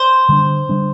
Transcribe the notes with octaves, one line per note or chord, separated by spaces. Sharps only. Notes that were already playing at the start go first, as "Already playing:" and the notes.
Already playing: C5
D3 G3 D4
D3 G3 D4